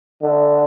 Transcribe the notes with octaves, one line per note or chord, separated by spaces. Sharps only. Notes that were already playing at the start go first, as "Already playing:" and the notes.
D3